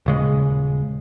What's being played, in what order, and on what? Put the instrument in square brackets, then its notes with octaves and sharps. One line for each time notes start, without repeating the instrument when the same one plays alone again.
[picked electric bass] D#1 C#3 G#3